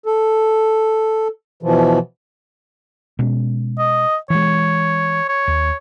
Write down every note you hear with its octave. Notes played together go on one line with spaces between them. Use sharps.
A4
B2 E3 F3
B2 G#3 C#4
D#5
E3 G#3 C#5
C#5
D#2